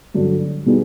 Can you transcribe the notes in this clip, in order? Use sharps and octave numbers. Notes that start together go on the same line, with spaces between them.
G2 D3 F#3
B2 G3 B3 D#4 G#4